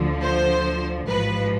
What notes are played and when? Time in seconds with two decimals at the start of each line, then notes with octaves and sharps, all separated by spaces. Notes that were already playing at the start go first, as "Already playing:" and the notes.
Already playing: D2 D3 F3
0.22 C5
1.08 A1 G#2 F3 B4